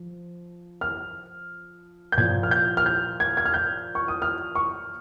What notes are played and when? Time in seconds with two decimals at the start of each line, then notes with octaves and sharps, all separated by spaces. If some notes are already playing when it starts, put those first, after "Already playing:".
Already playing: F3
0.81 F6
2.12 G6
2.17 A#2 F3 G#6
2.43 F6
2.51 G6
2.77 F6
2.86 G6
3.20 G#6
3.37 G#6
3.45 F6
3.54 G6
3.95 C#6
4.08 D#6
4.22 F6
4.55 C#6